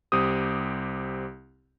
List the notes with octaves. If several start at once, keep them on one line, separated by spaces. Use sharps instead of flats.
C2 C4 G4 D#6